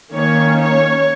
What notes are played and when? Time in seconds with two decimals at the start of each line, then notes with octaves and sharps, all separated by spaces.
0.13 D#3 A#3 C#4 C#5
0.61 C#5